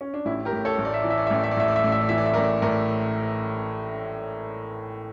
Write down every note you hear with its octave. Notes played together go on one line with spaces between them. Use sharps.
C#4
D4
A1 C#4 E4
G4 A#4
A2
A4 C#5
A1
D5
E5
E3 D5
E5
D5
E5
A1 D5
E5
D5
A2 E5
D5
E5
A1 D5
E5
D5
E3 E5
D5
E5
A1 A#4 D5
A2 A#4 D5